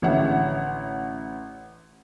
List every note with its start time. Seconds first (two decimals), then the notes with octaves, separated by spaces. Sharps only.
0.02 A1 D3 C#5 E5 F#5